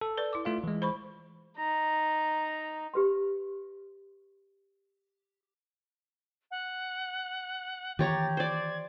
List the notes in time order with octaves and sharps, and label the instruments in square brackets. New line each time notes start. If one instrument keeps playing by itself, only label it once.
[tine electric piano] A4
[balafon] B4 D5
E4 D6
[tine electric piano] A3 F4 F5
E3 G#3
[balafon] C5 B5 C#6
[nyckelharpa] D#4 [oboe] A#5
[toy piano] G4 B4 C6
[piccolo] F#5
[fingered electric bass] D#3 E3 A#3 [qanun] G4 C#5 A#5 [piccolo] A6
[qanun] C5 D5 [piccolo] G#6